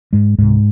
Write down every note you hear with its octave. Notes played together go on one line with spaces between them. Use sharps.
G#2 G#3
C#2 G#2 C3 G#3